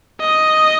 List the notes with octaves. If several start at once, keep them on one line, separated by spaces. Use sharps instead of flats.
D#5